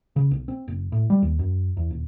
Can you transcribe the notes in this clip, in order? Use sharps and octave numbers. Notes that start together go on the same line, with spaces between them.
C#3
B1
C4
F#1
A2
G3
D#2
F#2
E2
D#1